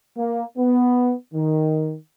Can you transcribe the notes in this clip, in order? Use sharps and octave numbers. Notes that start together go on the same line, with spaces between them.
A#3
B3
D#3